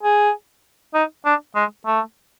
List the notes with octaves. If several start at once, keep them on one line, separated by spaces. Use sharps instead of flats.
G#4
D#4
D4
G#3
A3